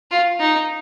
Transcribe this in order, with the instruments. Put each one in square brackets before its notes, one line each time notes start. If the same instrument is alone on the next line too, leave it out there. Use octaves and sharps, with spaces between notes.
[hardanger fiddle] F4
D#4